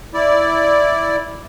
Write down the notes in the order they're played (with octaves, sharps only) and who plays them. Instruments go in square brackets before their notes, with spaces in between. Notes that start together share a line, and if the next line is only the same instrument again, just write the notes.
[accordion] E4 D5